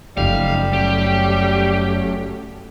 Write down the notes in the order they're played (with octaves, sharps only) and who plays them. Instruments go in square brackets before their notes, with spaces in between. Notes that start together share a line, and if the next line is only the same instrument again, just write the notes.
[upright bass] F#1 F#2 [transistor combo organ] F3 A3 D#4 [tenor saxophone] G3 [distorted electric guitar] F5
[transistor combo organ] F#3 A3 C#4 [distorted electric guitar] G4